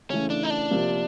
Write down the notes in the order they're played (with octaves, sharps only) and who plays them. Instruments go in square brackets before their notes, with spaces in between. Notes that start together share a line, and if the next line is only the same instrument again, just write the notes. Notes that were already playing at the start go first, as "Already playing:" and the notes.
[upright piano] C#3 E3 A3 [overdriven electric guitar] C#4
[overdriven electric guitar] D4
D#4
D4
[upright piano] C3 F3 A#3